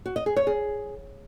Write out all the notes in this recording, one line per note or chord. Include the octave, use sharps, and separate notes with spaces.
F#4
D#5
G#4
C#5
G#4